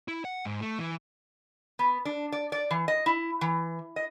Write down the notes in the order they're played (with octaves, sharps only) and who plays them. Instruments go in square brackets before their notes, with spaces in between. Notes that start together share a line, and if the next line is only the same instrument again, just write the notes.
[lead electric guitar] E4
F#5
G#2
A3
E3
[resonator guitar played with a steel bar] B3
D4
D5
D5
E3
D#5
E4
E3
D#5